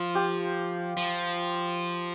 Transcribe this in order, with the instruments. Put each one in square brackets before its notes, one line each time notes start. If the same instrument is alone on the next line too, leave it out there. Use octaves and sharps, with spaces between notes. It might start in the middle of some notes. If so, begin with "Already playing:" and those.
Already playing: [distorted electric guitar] F3 [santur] F4
[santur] G4
[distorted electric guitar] F3